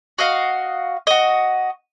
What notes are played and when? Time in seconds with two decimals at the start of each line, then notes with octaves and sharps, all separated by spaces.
0.18 F#4 D#5 F5
1.07 F#4 D#5